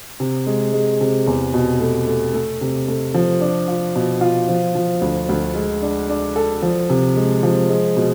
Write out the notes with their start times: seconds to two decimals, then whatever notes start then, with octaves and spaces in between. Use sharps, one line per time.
0.20 C3
0.47 G#3
0.73 G#3
1.01 C3
1.27 E2
1.54 B2
1.80 A3
2.07 A3
2.34 A3
2.61 C3
2.88 A3
3.14 F3
3.41 D4
3.68 F4
3.95 B2
4.21 F4
4.48 F3
4.75 F3
5.01 D2
5.29 D2
5.55 G#3
5.82 D4
6.09 D4
6.36 A4
6.62 F3
6.90 C3
7.17 G#3
7.43 F3
7.69 G#3
7.96 B2